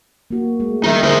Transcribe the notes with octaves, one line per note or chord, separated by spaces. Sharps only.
A#3 F#4
G#3 A3
G3 D#4 A#4 D#5 E5
D3 G#4 A#4 C5